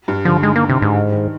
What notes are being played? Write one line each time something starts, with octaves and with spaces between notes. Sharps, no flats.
G2
D3 F3
D#3 G#3
A#3
C3
G#2
D#3